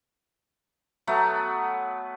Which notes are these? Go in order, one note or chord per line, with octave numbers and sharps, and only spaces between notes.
F#3 A3 B3